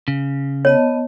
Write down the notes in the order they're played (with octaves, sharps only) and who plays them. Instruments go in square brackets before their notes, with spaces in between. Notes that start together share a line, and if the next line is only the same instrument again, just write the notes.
[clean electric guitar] C#3
[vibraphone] B3 D#5 A5 [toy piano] C#5